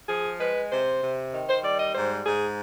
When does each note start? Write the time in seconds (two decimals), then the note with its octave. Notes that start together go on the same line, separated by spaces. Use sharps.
0.08 F3 G#4
0.39 G#3 B4
0.71 C3 C5
1.02 C3
1.33 D#3
1.48 C5
1.63 G3 D5
1.79 D#5
1.94 G#2 C5
2.25 G#2 G#4